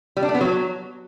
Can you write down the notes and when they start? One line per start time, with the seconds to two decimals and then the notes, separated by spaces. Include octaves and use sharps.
0.17 G3
0.23 D4
0.29 A3
0.35 B3
0.41 F#3